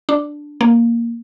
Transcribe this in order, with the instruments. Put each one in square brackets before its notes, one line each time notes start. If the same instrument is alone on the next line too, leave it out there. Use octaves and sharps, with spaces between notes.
[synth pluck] D4
A#3